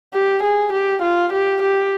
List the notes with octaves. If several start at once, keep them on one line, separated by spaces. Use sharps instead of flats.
G4
G#4
G4
F4
G4
G4